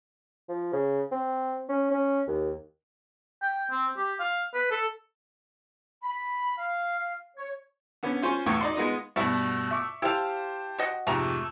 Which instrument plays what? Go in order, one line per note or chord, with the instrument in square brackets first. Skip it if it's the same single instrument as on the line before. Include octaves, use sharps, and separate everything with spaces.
[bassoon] F3
C#3
C4
C#4
C#4
D#2
[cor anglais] G5
C4
G4
F5
B4
A4
[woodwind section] B5
F5
C#5
[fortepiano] D3 B3 C#4
C#4 F4 C5 G#5 C#6
B1 E2 A2 B3 G5 C#6
D#4 D5 C6
G#3 B3 D#4 F4 D#5
[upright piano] G2 B2 [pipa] A3 E4 F#4
[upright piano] E5 C#6 D6
[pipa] E4 F5 [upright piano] G4 C5 A5
[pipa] F#4 D#5 F#5
[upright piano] F2 G#2 C3 [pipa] A3 A#5